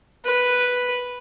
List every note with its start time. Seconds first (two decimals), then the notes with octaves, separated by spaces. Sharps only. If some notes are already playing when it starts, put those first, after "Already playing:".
0.25 B4